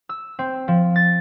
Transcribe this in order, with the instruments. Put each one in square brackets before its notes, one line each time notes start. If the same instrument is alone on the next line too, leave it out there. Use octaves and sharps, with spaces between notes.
[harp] E6
C4
F3
A6